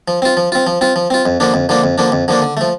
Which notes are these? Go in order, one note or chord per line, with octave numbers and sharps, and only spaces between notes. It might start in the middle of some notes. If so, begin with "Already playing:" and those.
F3
C4 F4
F3
C4 F4
F3
C4 F4
F3
C4 F4
F2
D3 F3 A#3 D4
F2
D3 F3 A#3 D4
F2
D3 F3 A#3 D4
F2
D3 F3 A#3 D4
D3
F3 A3